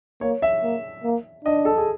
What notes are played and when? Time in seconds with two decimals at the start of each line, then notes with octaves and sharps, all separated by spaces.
0.21 A#3 C#5
0.42 E5
0.63 A#3
1.04 A#3
1.45 D4 D#5
1.65 A4
1.77 G#4